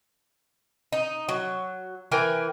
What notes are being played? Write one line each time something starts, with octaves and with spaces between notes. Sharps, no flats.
D#4
F#3
E3 A#4 G5 G#5